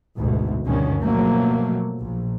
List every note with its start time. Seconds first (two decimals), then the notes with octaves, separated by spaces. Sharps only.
0.17 G#1 D2 B2
0.66 D2 G2 B2 D3 D#3 C#4
1.01 B2 F3 F#3 A3 A#3
2.03 A#1